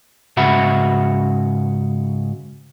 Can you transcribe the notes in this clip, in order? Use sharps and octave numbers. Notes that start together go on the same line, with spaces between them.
G#2 C#3 F#4 E5 F#5 B5